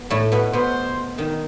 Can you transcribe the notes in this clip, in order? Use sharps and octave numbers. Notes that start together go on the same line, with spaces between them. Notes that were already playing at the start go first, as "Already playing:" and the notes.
Already playing: B3
A2 A3
B2 B3
B2 B3 C5
D#3 D#4